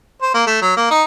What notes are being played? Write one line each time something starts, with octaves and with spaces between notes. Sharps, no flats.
C5
A#3
A3
F#3
A#3
D#4